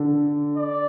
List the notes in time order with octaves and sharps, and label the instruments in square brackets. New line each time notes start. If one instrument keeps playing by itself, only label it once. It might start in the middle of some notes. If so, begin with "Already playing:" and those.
Already playing: [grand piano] D3
[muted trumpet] D5